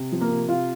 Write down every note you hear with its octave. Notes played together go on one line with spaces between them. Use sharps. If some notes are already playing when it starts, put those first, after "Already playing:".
Already playing: C3
F3
A#3 A#4
C3
C3 F4 F5